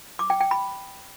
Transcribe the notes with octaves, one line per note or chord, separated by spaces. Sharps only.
D6
G5
G5
B5